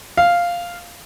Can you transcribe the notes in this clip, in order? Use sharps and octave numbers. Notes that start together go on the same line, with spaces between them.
F5